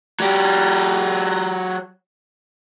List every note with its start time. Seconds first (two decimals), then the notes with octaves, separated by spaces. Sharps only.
0.20 F#3 G4